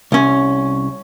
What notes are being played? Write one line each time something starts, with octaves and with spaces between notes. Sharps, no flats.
C2 C#4